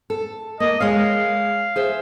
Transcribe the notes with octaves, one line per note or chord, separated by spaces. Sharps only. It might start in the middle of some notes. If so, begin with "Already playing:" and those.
A4
A#3 D#5
G#3 C#5 F5
G#4 C5 E5